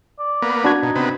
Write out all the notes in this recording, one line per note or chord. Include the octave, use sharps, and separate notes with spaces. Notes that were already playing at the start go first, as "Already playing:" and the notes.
D5
A#3 B3
D4 F#4 G#6
B2 D#4
C3 B3